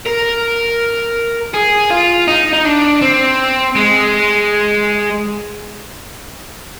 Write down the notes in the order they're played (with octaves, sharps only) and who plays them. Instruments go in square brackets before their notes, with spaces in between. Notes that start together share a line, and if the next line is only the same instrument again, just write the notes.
[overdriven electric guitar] A#4
G#4
F4
D#4
D#4
D4
C4
G#3